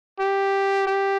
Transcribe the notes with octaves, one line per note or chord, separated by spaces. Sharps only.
G4
G4